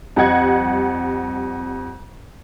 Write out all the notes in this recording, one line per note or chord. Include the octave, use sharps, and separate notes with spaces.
F2 G3 D#5 F#5 G#6